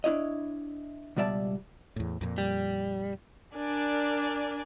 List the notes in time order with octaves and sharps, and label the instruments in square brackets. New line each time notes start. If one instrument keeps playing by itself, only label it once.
[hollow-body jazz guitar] D4 E4 C#5 D#5
C#2 B2 G3 D5 E5 A5
[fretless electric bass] E2 A2
F2 A#2
[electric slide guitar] G3
[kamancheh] D4 [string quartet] A#4 D5 G#5